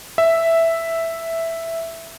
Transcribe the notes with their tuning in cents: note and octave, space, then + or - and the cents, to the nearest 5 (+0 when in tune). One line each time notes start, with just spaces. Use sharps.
E5 +0